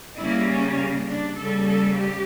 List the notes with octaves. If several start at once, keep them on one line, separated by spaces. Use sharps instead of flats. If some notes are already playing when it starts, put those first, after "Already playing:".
C#3 G3 A#3 E4
C#4
A#3
D4
C#3 G3 A#3 A4
A4
G4